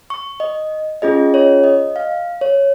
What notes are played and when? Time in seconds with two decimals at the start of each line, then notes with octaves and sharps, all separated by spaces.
0.10 C#6
0.40 D#5
1.02 C#4 F4 G#4 D#5
1.34 C#5
1.64 D#5
1.96 F5
2.41 C#5